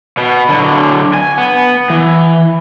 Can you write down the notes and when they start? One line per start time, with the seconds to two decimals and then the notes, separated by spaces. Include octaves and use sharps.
0.18 B2 B3
0.50 D3 F#3
1.14 G#5
1.38 B3
1.90 E3